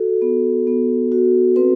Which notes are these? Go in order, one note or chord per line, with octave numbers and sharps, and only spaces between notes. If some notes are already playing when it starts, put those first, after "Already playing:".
Already playing: F#4 A4
B3
B3
F#4
C4 B4